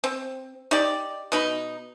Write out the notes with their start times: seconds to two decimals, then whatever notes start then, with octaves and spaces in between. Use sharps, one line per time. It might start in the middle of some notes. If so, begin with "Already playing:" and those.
0.04 C4
0.71 D#4 G4 D5
1.32 B2 D#4 B5